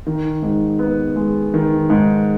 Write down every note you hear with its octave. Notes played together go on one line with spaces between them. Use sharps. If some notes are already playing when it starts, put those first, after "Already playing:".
D#3
G#2
B3
G#3
D#3
G#2